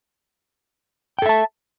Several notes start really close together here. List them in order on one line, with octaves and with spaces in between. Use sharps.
G5 A4 E5 A5